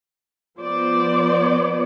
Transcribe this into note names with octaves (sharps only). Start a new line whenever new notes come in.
F3 B3 C5 D5